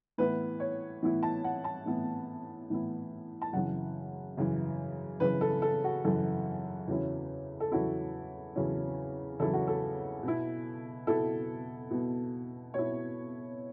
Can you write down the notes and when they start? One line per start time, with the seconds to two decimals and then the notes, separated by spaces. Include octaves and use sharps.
0.18 A2 E3 B3 E4 B4
0.60 C#5
1.03 A2 E3 B3 E4
1.23 A5
1.44 F#5
1.64 A5
1.86 A2 E3 B3 E4
2.70 A2 E3 B3 E4
3.42 A5
3.53 F#2 C#3 E3 F#5
4.37 F#2 C#3 E3
5.20 F#2 C#3 E3 B4
5.41 A4
5.62 A4
5.84 F#4
6.04 F#2 C#3 E3 A4
6.88 E2 C#3 F#3 C#4 E4
7.60 A4
7.72 E2 C#3 F#3 C#4 E4 F#4
8.55 E2 C#3 F#3 C#4 E4
9.40 E2 C#3 F#3 C#4 E4 A4
9.53 F#4
9.67 A4
10.23 B2 B3 E4
11.07 B2 B3 E4 A4
11.91 B2 B3 E4
12.74 B2 B3 E4 C#5